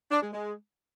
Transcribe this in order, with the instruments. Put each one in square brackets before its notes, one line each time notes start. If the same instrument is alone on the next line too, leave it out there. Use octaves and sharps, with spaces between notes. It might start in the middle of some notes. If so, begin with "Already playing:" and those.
[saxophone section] D4
G#3
G#3